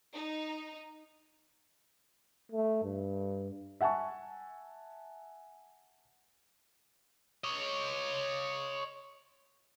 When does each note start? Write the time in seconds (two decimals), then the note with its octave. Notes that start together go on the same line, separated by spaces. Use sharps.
0.15 D#4
2.52 A3
2.83 G2
3.81 E5 F#5 G#5 A5 C#6
7.44 C#5 D#5